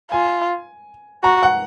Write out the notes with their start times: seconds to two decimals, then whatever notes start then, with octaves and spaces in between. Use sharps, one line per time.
0.12 F4 G#5
1.24 F#4 A#5
1.43 F#5